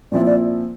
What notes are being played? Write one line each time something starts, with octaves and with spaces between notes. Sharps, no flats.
A#2 F3 C4 E4 D5
D5